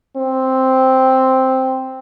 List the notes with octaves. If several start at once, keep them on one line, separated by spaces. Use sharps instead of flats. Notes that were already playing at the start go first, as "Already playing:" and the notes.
C4